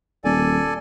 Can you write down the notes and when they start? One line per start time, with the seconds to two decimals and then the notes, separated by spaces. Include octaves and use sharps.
0.24 D#1 A4 D5 G#5